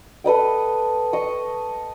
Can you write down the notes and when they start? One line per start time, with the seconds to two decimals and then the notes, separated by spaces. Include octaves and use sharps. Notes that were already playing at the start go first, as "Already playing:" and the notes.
0.24 A4 B4 D#5 G5
1.13 D#5 C#6